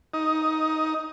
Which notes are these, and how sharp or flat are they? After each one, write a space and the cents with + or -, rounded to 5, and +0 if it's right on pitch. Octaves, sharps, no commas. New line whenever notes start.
D#4 +10